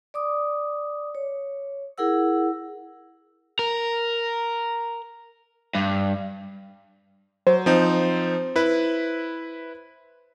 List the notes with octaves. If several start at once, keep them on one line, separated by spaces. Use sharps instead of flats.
D5 D6 D#6
C#5
E4 G#4 A#4 F#5 E6
A#4
G2
F#3 C5
F3 C4 D#4
E4 B4